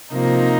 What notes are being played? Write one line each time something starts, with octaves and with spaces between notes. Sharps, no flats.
C3 F3 A#3 D#4